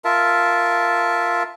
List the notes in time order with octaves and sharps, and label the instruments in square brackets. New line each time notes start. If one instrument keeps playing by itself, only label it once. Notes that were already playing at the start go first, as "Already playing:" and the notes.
[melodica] F4 A#4 E5 A5